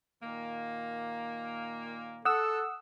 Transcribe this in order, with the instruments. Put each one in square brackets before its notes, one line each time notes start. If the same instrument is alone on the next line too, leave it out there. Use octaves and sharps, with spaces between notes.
[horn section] A#2 D#3 A#3
[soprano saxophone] A4 [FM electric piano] F#5 E6 [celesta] D#6